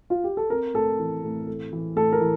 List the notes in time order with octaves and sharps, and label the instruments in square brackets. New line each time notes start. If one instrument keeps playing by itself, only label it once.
[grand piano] F4
G4
A4
[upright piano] C4 [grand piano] A#4
[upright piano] A2 [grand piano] A4
[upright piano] E3
A2
A3
E3
[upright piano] A2 [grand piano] A4
[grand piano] A#4
[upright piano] E3